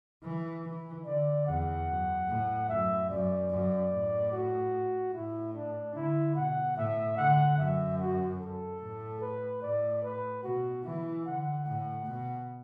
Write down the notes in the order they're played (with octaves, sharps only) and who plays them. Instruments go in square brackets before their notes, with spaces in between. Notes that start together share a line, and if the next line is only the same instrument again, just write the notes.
[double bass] E3
E3
[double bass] D3 [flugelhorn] D5
[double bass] E2 [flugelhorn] F#5
[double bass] F#2
A2
[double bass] F#2 [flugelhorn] E5
[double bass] F#2 [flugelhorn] D5
[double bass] F#2
A2
[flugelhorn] F#4
[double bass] A2 [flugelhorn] E4
[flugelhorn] D4
[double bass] D3 [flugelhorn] E4
[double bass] B2 [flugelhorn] F#5
[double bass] A2 [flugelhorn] E5
[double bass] D3 [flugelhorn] F#5
[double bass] F#2 [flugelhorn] E5
[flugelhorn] F#4
A4
[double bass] A2
[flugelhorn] B4
[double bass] A2 [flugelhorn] D5
[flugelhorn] B4
[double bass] B2 [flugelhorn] F#4
[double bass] E3 [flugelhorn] E4
[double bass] D3 [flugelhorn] F#5
[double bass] A2 [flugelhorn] F#5
[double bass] B2